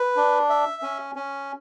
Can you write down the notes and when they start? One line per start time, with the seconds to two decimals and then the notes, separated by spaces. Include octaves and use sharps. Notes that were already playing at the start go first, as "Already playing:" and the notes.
Already playing: B4
0.16 D4
0.50 E5
0.82 C#4
1.15 C#4